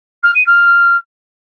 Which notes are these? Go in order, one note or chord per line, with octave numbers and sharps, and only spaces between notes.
F6
D#7
F6